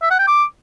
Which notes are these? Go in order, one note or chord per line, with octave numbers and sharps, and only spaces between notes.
E5
F#5
G5
D6